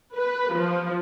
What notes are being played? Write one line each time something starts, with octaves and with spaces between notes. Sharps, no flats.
B4
F3